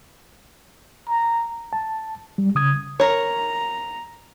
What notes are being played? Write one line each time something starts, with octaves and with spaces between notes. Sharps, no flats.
A#5
A5
G3
C#3 D#6 G#6
A#4 C#5 A#5